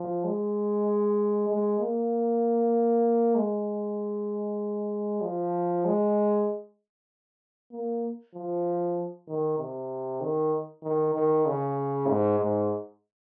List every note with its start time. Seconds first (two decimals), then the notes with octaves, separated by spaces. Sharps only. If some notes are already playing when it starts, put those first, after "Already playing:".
Already playing: F3
0.25 G#3
1.49 G#3
1.80 A#3
3.36 G#3
5.22 F3
5.85 G#3
7.71 A#3
8.35 F3
9.28 D#3
9.59 C3
10.21 D#3
10.83 D#3
11.15 D#3
11.46 C#3
12.08 G#2
12.39 G#2